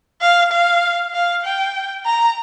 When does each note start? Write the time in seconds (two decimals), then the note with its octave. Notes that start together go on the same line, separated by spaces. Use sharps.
0.21 F5
0.52 F5
1.14 F5
1.44 G5
2.06 A#5